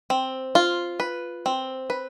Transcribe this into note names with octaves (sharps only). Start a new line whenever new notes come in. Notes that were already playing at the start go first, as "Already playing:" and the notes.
C4
F4
B4
C4
B4